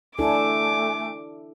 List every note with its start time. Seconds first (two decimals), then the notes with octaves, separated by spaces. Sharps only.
0.19 A3 D4 E4 A4 G#5 D6